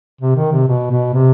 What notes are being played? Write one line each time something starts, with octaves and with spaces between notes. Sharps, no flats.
C3
D#3
C3
B2
B2
C3